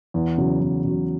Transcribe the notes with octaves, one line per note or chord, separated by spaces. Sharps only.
E2
C#3 F#3
E2
C#3 F#3